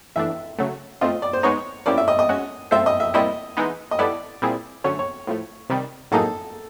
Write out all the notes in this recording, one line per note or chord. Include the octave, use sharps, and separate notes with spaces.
E3 A3 D4 E5
C#3 F#3 A3
A3 C4 F4 D#5
D5
C5
G#3 B3 D#4 C#5
F3 A#3 C#4 E4 G4 D5
E5
D#5
D#5
G#3 C#4 F#4
G#3 C4 F4 A4 C5 E5
D#5
E5
A#2 G3 C4 E4 D#5
E3 G#3 B3 D#4
D#5
G3 B3 E4 A4 D5
A#2 G3 C4 E4 G#4
D3 F#3 A3 C#4 C#5
C#5
A2 F3 A3
C3 D#3 G3
A2 F#3 A#3 D#4 G#4 A4